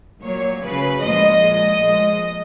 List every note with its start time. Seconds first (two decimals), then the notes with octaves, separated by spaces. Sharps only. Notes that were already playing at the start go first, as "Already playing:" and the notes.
0.23 A#2 F#3 C#5
0.63 C#3 F#3 B4
1.02 A#2 F3 G#3 D#5
1.41 A#2 G#3
1.80 A#2 F3 G#3